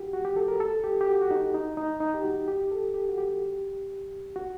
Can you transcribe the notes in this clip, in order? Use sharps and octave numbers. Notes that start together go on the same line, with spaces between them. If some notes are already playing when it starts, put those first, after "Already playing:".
Already playing: F#4 G4
F#4
G4
A4
A#4
A4
G4
G4
F#4
F#4
D#4
D#4
D#4
D#4
G4
F#4
G4
A4
G4
F#4
G4
F#4